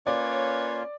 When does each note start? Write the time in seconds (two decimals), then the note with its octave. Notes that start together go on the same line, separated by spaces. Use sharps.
0.07 A#3 C#4 F4 B4 C#5 D5